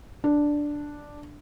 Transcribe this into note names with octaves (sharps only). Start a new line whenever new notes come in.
D4